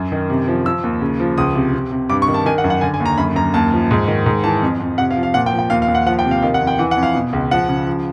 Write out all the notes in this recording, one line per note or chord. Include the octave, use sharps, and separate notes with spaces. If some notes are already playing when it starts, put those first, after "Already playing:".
Already playing: F#2
D#3
C3
F3
F3 E6
D#2
C#3
F3
C#2 D#6
C3
C3
C3
G2 D6
C#6
D#3
A5
D#3 G#5
F#5
F#2
F#5
D3 G#5
G#5
D#2
A#5
F#2 B5
F#2 A#5
D#2 A5
F3
G#2
D#3
G#2
E3 A5
F2
F2
C3 F#5
F5
F3
F5
A#2 F#5
G5
F3
G5
D#2 F5
F5
D#2
F#5
F3 F#5
G5
C3
F5
D#3 F5
F#5
F2
G5
E3 F#5
F#5
F2
F5
B2
C#2
F3 F#5
C#3
F3